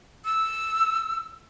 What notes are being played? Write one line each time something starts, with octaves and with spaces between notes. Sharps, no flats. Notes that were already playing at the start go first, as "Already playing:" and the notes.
E6